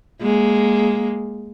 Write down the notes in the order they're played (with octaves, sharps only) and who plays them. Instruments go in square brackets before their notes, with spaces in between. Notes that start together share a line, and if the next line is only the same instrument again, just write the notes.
[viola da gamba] G#3 A#3